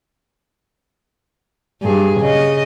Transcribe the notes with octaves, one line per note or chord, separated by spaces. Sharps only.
G2 G#4
C#3 D#5